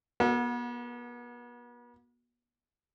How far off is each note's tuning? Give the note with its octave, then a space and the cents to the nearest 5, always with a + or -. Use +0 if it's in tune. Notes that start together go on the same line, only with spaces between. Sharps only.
B3 -40 F#4 -20 A4 +25